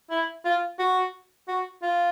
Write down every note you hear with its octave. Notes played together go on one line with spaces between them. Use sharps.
E4
F4
F#4
F#4
F4